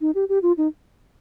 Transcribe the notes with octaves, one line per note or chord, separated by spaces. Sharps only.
D#4
G4
G4
F4
D#4